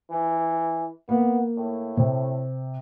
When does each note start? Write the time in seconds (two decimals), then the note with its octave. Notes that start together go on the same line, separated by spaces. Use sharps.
0.10 E3
1.09 A#3 B3
1.57 A2
1.97 C3